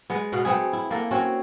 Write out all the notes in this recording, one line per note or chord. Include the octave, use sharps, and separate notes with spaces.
G#3 B3
B2 F5 F#5
A3 B3 C4 G#4
E4
A#3 A4 F#5
C4 C#4 F#4 C#5